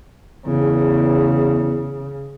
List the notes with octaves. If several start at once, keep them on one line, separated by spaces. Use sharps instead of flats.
E2 C#3